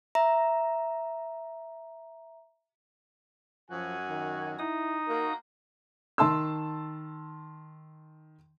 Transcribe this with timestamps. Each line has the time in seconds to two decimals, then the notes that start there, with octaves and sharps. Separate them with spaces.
0.15 E5 A#5
3.70 F#2 F3 F#4 G#5
4.08 D#3
4.59 D#4 E4 D#6
5.08 A#3 F#4 A#4
6.18 D#3 A5 C6 E6